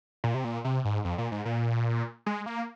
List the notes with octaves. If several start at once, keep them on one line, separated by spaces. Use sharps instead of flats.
A#2
C3
A#2
C3
G#2
F2
A#2
G#2
A#2
G#3
A#3